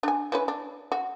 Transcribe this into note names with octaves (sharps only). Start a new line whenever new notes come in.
D4 G#5
E3 C#4 B4
D4
F#4